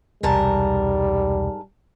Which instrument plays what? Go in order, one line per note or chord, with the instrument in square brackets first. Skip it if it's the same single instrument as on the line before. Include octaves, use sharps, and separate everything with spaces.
[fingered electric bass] E1 C2 [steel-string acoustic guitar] G#2 A#4 A5 [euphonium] G3